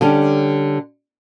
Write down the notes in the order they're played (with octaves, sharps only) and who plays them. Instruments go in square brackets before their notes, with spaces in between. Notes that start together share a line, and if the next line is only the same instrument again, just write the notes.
[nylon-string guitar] D3 G3 C#4 G4